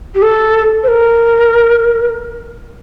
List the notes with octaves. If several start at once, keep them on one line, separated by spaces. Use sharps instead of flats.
G4
A4
C5
A#4